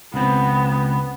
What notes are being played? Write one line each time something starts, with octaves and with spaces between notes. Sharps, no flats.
C#2 B3 C4